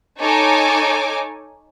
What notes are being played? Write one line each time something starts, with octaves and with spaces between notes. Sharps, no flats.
D#4 A4 C#5 G#5 D6